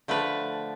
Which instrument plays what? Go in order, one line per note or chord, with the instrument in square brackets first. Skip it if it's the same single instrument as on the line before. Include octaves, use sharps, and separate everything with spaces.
[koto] D3 F3 A3 B4